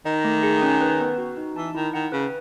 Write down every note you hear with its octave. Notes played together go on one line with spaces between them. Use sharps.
D#3 D#5
A3
G#4
C#4
B4
B3
F#4
D#4
E3 A5
D#3 E4
D#3 F#5
C#3 B4